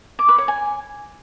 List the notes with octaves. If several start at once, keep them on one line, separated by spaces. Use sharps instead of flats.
D6
B4
C#5
G#5